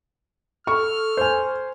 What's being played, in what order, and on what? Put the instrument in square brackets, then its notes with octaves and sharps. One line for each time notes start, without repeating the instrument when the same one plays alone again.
[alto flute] A4 [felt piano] C#6 [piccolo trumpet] F6
[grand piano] C5 G#5